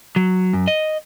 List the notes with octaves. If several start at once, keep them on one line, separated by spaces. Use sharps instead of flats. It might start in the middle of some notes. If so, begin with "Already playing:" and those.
F#3
F#2
D#5